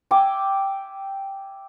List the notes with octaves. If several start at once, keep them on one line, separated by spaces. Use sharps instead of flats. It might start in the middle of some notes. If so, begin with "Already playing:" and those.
E5 G5 G#5 D6